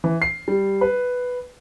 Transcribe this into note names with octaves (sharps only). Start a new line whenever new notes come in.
E3
C7
G3
B4